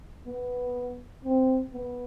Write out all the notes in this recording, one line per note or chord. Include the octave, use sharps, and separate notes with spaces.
B3
C4
B3